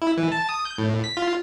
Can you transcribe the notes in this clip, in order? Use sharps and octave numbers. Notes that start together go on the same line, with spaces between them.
E4
E3
A5
D#6
G6
A2
B6
F4